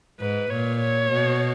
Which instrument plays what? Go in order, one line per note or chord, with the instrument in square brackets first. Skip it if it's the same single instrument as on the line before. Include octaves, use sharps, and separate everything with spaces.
[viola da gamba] G#2 [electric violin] B4
[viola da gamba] A#2 [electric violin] C#5
[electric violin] C#5
[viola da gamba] B2